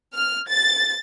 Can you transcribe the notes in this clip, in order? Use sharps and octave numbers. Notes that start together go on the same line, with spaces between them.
F6
A6